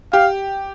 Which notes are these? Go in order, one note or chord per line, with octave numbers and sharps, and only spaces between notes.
G4 F5